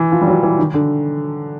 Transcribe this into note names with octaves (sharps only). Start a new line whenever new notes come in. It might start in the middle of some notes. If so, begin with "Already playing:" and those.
Already playing: E3
F3
G3
F#3
E3
D#3
D3